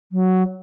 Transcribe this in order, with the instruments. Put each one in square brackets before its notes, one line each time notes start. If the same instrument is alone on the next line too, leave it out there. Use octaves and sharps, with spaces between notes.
[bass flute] F#3